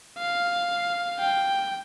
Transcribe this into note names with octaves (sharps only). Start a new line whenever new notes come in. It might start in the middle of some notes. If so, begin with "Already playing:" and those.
F5
G5